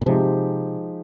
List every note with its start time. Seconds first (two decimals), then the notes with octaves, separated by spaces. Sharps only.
0.01 A#2
0.06 C3 F3 G#3 D#4 G4